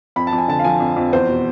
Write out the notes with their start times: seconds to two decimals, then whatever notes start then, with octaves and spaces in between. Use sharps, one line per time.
0.16 F2 B5
0.27 A5
0.33 F2
0.38 G#5
0.48 D3 A5
0.59 F5
0.64 F3 G#5
0.80 F2
0.96 F2
1.12 E2 C5
1.29 B2